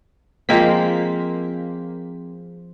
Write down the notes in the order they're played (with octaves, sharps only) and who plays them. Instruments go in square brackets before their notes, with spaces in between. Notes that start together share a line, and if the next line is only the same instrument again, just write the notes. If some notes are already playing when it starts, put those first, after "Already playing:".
[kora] F3 G#3 C4 [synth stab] A#3 B6